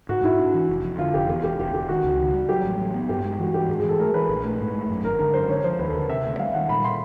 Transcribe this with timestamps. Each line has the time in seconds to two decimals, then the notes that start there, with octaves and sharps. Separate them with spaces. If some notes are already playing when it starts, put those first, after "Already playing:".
0.09 G#2 F#4
0.23 G#2 E4
0.39 D4
0.54 E3
0.69 F1
0.84 F2
0.99 D3 F4
1.14 F1 G4
1.29 E2 G4
1.44 E1 G4
1.59 E1 G4
1.74 E1 G4
1.89 D#3 F#4
2.04 C#2
2.19 D#3
2.34 G3
2.49 F#3 G4
2.63 A1
2.79 F#3
2.94 B3
3.09 G2 G4
3.24 G#3
3.39 E3 F#4
3.54 G2 G4
3.68 G#2 G#4
3.79 G#4
3.84 E3
3.89 A4
3.99 A3 A#4
4.14 E3 B4
4.29 A#1
4.44 A3
4.59 G#2
4.74 A3
4.89 F#2
5.04 G#1 A#4
5.19 D3 A#4
5.34 F#2 C5
5.49 D3 C#5
5.64 F3 C5
5.79 D#2 B4
5.87 A4
5.94 D3 A#4
6.09 C3 E5
6.24 D2 E5
6.39 G3 F5
6.54 D#3 F#5
6.69 A#2 B5
6.85 C6